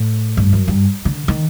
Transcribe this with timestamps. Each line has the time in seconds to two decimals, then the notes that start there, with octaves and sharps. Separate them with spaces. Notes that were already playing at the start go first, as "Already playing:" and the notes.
Already playing: A2
0.37 G2
0.53 F#2
0.68 G2
1.05 D3
1.28 D#3